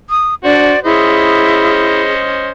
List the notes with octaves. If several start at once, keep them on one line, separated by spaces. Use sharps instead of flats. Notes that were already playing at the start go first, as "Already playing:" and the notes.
D#6
D4 F#4 C5 D5
C#4 E4 G#4 C5 D#5